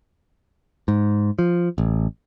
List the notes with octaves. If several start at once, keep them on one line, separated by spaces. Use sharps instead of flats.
G#2
F3
A1